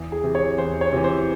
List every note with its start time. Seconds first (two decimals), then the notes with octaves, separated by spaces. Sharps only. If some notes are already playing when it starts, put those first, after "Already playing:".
Already playing: E2
0.12 G#4
0.24 C3 E3
0.35 C#5
0.58 E2 C5
0.81 C#5
0.93 C3 E3
1.04 C5